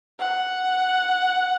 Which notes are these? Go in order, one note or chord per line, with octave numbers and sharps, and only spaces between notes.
F#5